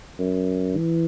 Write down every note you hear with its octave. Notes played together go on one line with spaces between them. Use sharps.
F#2
E3